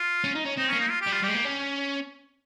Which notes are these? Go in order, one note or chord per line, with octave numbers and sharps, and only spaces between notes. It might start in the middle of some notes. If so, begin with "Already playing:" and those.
Already playing: F4
C#4
D#4
C#4
C4 D#4
C#4
A#3
D#4
F4
G4
G3
F4
G3 G4
G#3
A#3
C#4